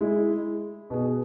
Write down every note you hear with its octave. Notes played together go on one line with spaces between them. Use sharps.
G#3 E4 G#4
B2 B3 G#4